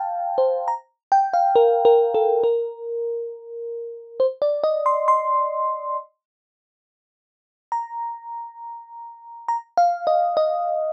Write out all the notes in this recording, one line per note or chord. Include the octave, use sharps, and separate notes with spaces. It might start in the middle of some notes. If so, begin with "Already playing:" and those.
Already playing: F5 G5 A5
C5
A#5
G5
F5
A#4
A#4
A4
A#4
C5
D5
D#5
C6
C6
A#5
A#5
F5
D#5
D#5